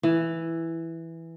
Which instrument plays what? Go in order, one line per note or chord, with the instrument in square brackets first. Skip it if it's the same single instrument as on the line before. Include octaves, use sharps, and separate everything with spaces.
[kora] E3